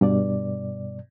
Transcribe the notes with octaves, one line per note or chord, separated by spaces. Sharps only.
G2 B2 D5